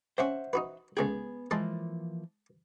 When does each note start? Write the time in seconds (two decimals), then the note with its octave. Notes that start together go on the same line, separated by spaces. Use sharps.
0.18 C4 C#4 C5 E5 F#5
0.53 D#4 F#4 B4
0.97 C#2 A3 B3 G#4 G5
1.51 E3 F3 G#3 A#3 A5 C6